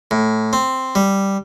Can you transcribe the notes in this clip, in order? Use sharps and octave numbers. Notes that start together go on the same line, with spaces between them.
A2
C4
G3